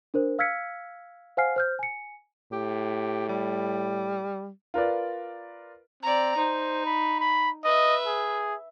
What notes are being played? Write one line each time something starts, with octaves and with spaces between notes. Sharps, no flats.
D4 A#4 C5
F5 E6 F6 G#6 B6 C#7
C5 F5 F#5 G#5 F6 C7
C5 F6 G6
G#5 C#7
A2 G4
G3
F4 A#4 B4 D5
C4 D5 A#5
D#4 C5
B5
B5
B4 D#5 E5
G#4